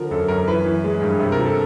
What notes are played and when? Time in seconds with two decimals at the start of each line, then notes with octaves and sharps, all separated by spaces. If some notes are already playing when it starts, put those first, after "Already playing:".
Already playing: D3 F3 A#4
0.11 F#2 A4
0.28 F#2 A#4
0.47 E3 B4
0.65 E3
0.84 G#3
1.02 G2
1.20 C3
1.32 A#4
1.39 F3
1.45 A4